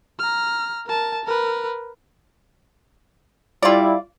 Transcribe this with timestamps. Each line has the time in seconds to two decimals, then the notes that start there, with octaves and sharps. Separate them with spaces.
0.19 A#5 F6
0.86 A#4 A5
1.25 A#4 B4
3.62 G3 E4 F4 D5